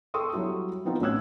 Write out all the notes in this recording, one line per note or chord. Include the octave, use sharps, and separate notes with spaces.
A4 G5 C6 C#6 D#6 E6
F#3 G3 E4 F#4
F3 B3 C4 D#4 F4 F#4
A1 A2 C#4 E6 F#6 G#6